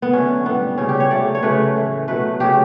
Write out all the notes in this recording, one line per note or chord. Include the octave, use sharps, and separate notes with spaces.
B3
D3 F#3 A3 C#4
A2 G3 B3
C#3 G3 C#4
G4
C#5
C#3 F#3 A3 D5
C#5
C#3 F#3 A3 B4
A2 E3 A3
B2 F#3 A3 B4
C#3 F#3 A3 G4